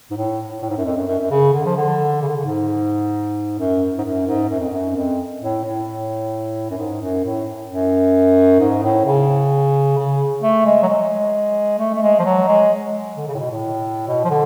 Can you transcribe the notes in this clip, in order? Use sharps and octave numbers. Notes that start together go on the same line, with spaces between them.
G#2
A2
A2
G#2
F#2
F2
F#2
F#2
F#2
C#3
D3
F3
D3
C#3
D3
C#3
G#2
F#2
G#2
F#2
G#2
F#2
F2
F#2
F2
A2
A2
F#2
G#2
F#2
A2
F#2
G#2
A2
C#3
C#3
A3
G#3
F#3
G#3
A3
A3
G#3
F3
F#3
G#3
D3
C#3
A2
B2
A2
B2
F3
D3